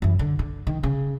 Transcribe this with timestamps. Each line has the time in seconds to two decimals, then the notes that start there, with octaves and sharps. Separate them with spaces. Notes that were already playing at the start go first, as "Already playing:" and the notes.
0.02 F#2 E3
0.19 D3
0.39 D3
0.67 D#3
0.83 C#3